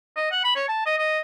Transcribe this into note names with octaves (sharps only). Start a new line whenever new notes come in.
D#5
F#5
B5
C#5
A5
D#5
D#5